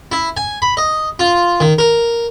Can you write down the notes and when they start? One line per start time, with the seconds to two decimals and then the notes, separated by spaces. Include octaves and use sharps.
0.12 E4
0.37 G#5
0.62 B5
0.77 D#5
1.19 F4
1.60 D#3
1.78 A#4